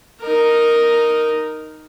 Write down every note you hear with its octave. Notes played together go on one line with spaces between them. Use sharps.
D#4 A#4